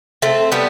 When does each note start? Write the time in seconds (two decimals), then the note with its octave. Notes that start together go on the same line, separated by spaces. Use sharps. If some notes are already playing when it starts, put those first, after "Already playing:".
0.22 A3 C4
0.52 G3 B3